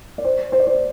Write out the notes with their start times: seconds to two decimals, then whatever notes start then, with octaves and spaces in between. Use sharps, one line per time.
0.18 D5
0.24 C5
0.52 C5
0.60 D5
0.67 C5